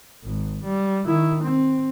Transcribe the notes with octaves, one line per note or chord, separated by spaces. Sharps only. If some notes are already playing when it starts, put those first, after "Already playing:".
G#1
G3
D#3 E4
C4